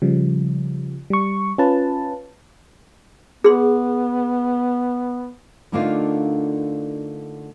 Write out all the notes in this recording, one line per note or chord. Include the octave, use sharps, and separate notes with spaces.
C#3 F3 G3
G3 C#6
C#4 F4 B4 A5
B3 G#4 C6
D3 A3 A#3 D4 D#4 F4